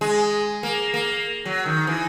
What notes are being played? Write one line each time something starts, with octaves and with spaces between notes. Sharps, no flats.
G#3
A#3
A#3
F#3
D#3
E3